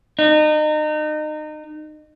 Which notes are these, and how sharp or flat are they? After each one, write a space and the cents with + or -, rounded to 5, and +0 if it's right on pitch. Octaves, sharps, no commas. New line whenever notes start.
D#4 -30